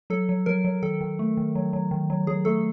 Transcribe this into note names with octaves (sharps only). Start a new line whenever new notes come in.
F#3 A4
F#3
F#3 A#4
F#3
D#3 A4
D#3
A3
D#3
F#3
F#3
D#3
F#3
F#3 G#4
A3 A4